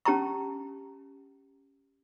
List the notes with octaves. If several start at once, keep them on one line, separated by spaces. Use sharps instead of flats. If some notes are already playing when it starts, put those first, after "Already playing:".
C#4 G4 A5 A#5 C#6